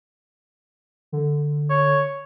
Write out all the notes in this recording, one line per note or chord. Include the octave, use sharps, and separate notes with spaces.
D3
C#5